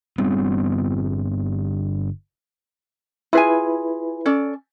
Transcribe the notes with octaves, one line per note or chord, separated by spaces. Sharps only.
G1 G3 B3 C4
E4 F4 G#4 B4 G#5
C#4 A4 D5